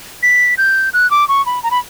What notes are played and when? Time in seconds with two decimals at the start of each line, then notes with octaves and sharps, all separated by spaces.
0.23 B6
0.58 G6
0.93 F#6
1.11 D6
1.28 C#6
1.46 B5
1.63 A#5
1.71 B5